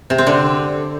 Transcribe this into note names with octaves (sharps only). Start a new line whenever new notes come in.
C3
C4
D3